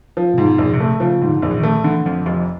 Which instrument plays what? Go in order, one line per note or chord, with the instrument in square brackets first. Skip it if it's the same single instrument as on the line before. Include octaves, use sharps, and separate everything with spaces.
[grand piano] F3
[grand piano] G#2 [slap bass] C3
[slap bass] B2
[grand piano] A#1
[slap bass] C3
[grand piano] A3
[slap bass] C#3 [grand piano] F3
[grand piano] G#2
[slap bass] D3
[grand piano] A#1
[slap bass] E3
D#3
[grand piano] A3
[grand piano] D3 [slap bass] E3
[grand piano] F2 [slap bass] F3
[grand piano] F1 [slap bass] F3